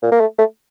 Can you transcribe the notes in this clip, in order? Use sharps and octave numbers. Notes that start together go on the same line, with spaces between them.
A#2
A#3
A3
A3